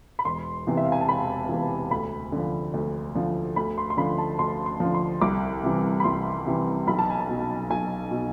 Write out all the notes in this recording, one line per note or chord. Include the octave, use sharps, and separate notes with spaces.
B5
E1 C6
E2 C3 E3
E5
F5
G#5
A5
E1 B5
E2 C3 E3
D2 B5
D3 F3
D2
D3 F3
D2 B5
C6
C6
D3 F3 B5
A5
D2 C6
C6
D3 F3
C6
C2 D6
C3 E3
B5
C2 C6
C3 E3
B1 B5
A5
G#5
A5
B2
B1 G#5
B2